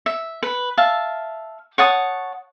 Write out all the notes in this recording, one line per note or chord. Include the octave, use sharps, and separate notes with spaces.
E5
B4
E5 F5 A5
C#5 F#5 A5 D#6